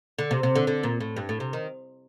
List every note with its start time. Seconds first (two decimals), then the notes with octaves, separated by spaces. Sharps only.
0.18 D3
0.31 C3
0.43 C3
0.55 D3
0.67 D3
0.83 A#2
1.00 A2
1.17 G2
1.29 A2
1.40 C3
1.53 D#3